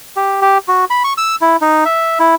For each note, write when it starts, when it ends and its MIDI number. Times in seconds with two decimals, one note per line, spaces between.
0.16 0.41 67
0.42 0.58 67
0.68 0.85 66
0.90 1.03 83
1.04 1.13 85
1.18 1.36 88
1.41 1.56 64
1.61 1.84 63
1.85 2.19 76
2.19 2.35 64